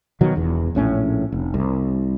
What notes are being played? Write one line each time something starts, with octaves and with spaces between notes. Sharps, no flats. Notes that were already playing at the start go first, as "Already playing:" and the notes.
B2 D#3 F#3
E1 E2
A#1 A2 C#4
F1
C2